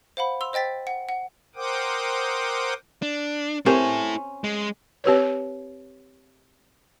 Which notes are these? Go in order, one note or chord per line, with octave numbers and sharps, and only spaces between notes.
C5 F5 F#5 B5
C6 E6 F7
C5 D#5 G5 A6 B6
F#5
F#5
A#4 C5 F#5 G5 D6 D#6
D4
C4 C#4 E4 G4 A4 A#4 C5
G#3
C4 G4 B4 C#5